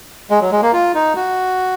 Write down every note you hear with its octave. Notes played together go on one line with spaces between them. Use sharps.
G#3
F#3
G#3
A#3
F4
D#4
F#4